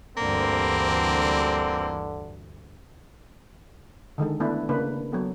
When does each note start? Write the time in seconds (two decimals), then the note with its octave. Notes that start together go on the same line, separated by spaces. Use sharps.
0.17 D2 G2 D3 E3 A#3 C4
4.18 D3 D#3 G#3 A4
4.40 A3 B3 D4 E4 B4
4.69 C#3 A#3 D4 B4
5.12 F#3 B3 A4